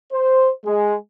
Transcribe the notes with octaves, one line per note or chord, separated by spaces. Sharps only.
C5
G#3